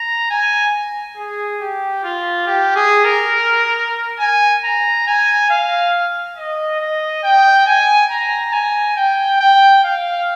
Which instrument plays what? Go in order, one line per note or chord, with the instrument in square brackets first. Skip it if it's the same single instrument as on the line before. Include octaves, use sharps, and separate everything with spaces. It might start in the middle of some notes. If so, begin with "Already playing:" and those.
Already playing: [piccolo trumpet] A#5
G#5
G#4
G4
F4
G4
G#4
A#4
G#5
A#5
G#5
F5
D#5
D#5
G5
G#5
A#5
G#5
G5
G5
F5